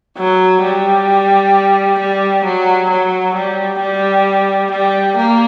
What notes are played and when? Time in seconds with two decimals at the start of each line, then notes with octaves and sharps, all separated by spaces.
0.18 F#3
0.63 G3
2.00 G3
2.45 F#3
2.90 F#3
3.35 G3
3.80 G3
4.71 G3
5.17 A#3